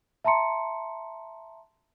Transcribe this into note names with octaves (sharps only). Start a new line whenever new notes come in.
E5 A5 A#5 C6 C#7